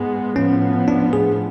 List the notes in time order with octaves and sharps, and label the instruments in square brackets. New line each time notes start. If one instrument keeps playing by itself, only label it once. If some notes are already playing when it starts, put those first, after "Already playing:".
Already playing: [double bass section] G#2 G#3 B3
[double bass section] A2 F3 B3 [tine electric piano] C#4
[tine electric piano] D4
G#4